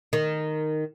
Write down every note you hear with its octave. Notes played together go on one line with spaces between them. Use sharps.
D#3